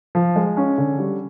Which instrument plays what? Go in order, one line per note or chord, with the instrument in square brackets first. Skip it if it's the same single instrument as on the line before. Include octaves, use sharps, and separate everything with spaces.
[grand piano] F3
G#3
C#4
D3
G3